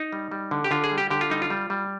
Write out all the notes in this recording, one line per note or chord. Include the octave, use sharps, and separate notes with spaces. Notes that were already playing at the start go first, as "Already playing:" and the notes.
Already playing: D#4
G3
G3
D3
G4
D3 F4
G#4
G3
G4
D3 G4
F4
G3 D#4
F4
G3
G3